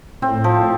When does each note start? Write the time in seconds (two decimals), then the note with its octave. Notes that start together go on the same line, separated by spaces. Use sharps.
0.22 A2 C4
0.44 F3